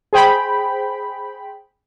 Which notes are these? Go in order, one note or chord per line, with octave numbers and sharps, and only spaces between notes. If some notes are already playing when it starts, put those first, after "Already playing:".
G#4 C5 G5 B5